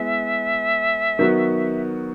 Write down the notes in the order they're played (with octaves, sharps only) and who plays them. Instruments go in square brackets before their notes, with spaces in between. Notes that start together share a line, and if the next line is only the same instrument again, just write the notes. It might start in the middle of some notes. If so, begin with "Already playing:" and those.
Already playing: [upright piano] G#3 B3 E4 [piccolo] E5
[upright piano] D#3 F#3 B3 F#4